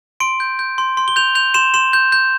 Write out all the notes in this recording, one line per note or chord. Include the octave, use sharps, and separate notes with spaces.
C6 D7
G6
G6
C6
C6
G7
G6 F7
G6 F7
C6 E7
C6 E7
G6
G6